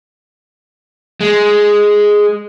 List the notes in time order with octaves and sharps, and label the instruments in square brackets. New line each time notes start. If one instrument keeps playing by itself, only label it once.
[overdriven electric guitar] G#3